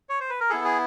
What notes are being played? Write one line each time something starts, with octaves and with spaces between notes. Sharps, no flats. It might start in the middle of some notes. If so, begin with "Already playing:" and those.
C#5
C5
B4
A#4
B3 E4 G#4 A4
G#4